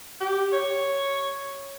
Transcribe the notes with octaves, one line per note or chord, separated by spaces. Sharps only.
G4
C#5